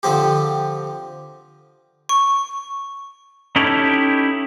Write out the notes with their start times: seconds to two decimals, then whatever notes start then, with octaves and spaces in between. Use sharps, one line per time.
0.03 D3 F3 C4 G4
2.09 C#6
3.56 C#4 D#4 E4 G4 A4 C#5